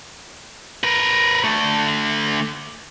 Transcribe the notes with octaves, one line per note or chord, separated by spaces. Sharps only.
A#4 B4
D3 A3